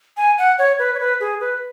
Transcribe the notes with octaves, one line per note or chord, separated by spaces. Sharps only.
G#5
F#5
C#5
B4
C#5
B4
G#4
B4